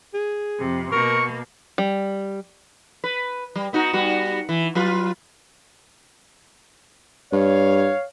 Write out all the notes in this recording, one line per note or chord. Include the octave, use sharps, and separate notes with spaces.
G#4
F2 C3
B2 A#3 A#4 C#6
G3
B4
G3
B3 D#4 F#4
G3 B3 F#4
E3
F#3 F4 B4
G2 C#5 F5